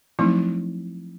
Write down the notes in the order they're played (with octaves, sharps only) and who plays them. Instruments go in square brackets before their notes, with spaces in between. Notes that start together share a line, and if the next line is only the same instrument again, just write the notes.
[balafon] F3 F#3 A3 C4 D#4 E4